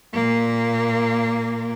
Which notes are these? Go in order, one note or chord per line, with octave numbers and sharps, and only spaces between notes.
A#2 A#3